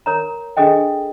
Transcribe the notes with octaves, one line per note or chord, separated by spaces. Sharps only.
A#4 C#5 A#5
D4 G#4 A4 D#5 G5